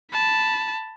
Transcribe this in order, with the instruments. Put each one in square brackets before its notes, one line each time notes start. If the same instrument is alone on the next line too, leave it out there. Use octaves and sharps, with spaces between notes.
[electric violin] A5 B5